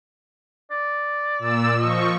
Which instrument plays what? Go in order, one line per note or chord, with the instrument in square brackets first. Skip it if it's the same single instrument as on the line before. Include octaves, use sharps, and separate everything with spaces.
[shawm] D5
[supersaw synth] A#2 E6
[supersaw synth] F3 C#6 [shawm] D#5